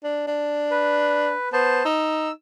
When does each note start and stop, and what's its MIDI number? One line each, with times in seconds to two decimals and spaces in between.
0.04 0.24 62
0.27 1.33 62
0.71 1.49 71
1.53 1.83 59
1.53 1.84 72
1.53 1.84 81
1.85 2.30 63
1.85 2.32 88